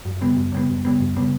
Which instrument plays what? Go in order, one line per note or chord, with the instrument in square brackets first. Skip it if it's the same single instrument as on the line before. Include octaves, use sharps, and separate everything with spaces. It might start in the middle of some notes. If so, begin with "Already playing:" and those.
[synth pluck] F#2
C#3 G3 B3
F#2
C#3 G3 B3
F#2
C#3 G3 B3
F#2
C#3 G3 B3